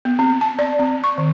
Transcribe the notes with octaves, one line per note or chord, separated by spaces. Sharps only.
B3
C4
A5
D5
C4
C#6
D#3